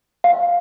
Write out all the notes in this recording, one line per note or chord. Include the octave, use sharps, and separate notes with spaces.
F5